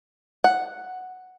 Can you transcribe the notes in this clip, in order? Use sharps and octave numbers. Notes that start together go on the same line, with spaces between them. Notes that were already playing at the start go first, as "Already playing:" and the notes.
F#5